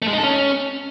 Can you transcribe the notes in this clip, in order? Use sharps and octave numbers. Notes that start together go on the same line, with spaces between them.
A3
G#3
D#4
A4
C#4